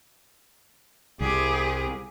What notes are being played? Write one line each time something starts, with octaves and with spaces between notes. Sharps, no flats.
C2 G4 G#4